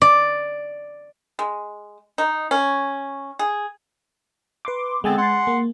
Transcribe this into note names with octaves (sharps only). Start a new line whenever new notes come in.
D5
G#3
D#4
C#4
G#4
B4 C6 D6
D3 G#3 B3 C4 G#5 A6
F#5 C6
A#3